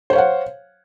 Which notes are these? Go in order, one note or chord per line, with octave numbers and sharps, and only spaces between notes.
C5 C#5 F5 F#5